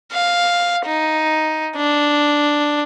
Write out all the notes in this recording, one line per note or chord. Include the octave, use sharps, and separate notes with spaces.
F5
D#4
D4